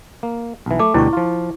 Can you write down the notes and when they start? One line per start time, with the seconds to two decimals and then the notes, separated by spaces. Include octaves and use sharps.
0.23 A#3
0.66 B1 E3
0.79 A3 D6
0.94 D2 B2 G3 E4 C#6
1.13 F3 F4